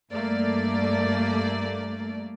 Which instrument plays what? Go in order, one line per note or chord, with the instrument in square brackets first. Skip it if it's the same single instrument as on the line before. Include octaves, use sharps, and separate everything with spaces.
[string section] G2 A3 A#3 D5